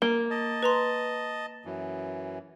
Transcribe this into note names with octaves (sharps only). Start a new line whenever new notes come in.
A#3 A#4
D#5 A5
B4 A#5 C6
F#2 E3